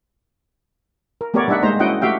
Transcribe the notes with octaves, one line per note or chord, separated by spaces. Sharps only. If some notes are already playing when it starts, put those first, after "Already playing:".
A#4
A3 B3 G4 A#4 C#5 D5
G3 D4 D#4 E5 F#5
G#3 A#3 D#4 C5 A#5
C#4 E4 F#4 D#5 F#5 G5
A3 F#4 G4 E5 F5 G5